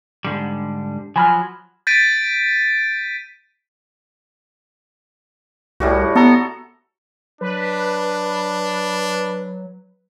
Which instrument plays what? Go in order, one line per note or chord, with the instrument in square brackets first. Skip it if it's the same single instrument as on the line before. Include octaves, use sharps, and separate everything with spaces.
[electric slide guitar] G#2 D3 G3
[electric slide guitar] F3 F#3 [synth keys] G#5 B5 F6
[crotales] G6 A6 B6 D7 D#7
[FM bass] C2 [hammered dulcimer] A2 G3 F#4
[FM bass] B3 [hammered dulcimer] A4 A#5
[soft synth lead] F#3 [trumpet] D4 [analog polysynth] B4